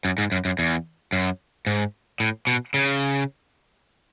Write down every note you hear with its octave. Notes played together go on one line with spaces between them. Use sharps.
F#2
G#2
F#2
F#2
E2
F#2
G#2
A2
B2
C#3